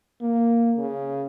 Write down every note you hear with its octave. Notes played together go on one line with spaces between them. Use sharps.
A#3
C#3